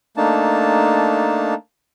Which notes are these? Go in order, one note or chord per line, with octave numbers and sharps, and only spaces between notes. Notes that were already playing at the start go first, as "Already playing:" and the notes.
A3 A#3 D4 D#4 A5